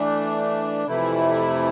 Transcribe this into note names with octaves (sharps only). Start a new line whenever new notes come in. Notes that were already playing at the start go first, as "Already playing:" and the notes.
Already playing: E3 A3 D4
F2 C3 E3 A3 E4